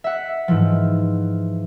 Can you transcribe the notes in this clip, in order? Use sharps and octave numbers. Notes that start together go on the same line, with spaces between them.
E5 F#5
G#2 E3 F3